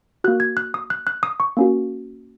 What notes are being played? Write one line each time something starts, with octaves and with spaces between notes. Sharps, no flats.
A#3 F#4 F#6
G#6
F#6
D#6
F#6
F#6
D#6
C#6
A#3 C#4 F#4